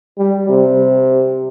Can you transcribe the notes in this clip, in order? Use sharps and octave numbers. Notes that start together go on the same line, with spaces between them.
G3
C3